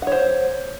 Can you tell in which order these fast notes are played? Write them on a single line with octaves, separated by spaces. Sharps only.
F#5 C#5 C5